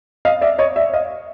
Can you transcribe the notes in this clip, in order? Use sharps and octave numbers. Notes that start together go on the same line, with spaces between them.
D#5 F5
D5 E5
C#5 D#5
D5 E5
D#5 F5